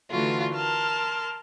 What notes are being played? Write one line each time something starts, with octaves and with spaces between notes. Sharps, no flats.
D3 E3 A3 F4 F#4
A#4 A5 C6 F6